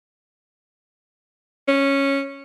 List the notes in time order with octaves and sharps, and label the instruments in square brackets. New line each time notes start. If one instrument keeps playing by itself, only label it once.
[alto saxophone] C#4